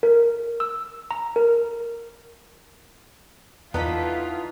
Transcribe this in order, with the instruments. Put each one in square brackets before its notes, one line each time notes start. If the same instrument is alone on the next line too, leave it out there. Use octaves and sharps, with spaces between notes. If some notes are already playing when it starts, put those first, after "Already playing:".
[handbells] A#4
E6
A#5
A#4
[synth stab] E2 B6 [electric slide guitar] E3 D#4 [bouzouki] B3 D4 A4 [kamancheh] F4